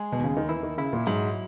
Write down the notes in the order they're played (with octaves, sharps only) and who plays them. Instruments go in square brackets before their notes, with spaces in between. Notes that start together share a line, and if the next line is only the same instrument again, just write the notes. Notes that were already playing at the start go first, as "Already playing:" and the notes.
Already playing: [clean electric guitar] G#3
[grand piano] B2
[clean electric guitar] D#2 [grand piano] C#3
[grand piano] D#3
[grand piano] E3 [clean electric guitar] E4
[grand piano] D#3
[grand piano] C#3 [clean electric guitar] E4
[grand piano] A#2
[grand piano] G#2 [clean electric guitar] F#3